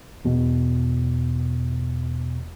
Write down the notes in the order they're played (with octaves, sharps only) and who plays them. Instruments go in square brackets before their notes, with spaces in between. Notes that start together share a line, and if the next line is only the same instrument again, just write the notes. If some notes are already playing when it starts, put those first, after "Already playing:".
[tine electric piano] E2 B2